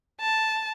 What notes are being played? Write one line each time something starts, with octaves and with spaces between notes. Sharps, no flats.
A5